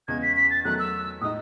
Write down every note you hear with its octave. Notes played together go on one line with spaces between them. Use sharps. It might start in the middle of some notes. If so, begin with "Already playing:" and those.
E2 C#3 G#3 G#6
B6
B6
A6
E2 D#3 F#3 A3 F#6
E6
A2 G#3 D#4 D#6